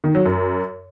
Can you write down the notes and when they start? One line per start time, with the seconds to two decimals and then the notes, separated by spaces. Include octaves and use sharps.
0.04 D#3
0.15 F#3
0.26 F#2